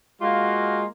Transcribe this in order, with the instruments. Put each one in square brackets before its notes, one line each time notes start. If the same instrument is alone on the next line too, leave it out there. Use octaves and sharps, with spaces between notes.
[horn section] G#3 A#3 F4 F#4